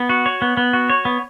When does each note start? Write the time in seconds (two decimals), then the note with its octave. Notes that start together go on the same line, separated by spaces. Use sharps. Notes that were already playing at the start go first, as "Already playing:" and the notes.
Already playing: B3
0.09 F#4
0.26 C#5
0.42 B3
0.57 B3
0.73 F#4
0.90 C#5
1.05 B3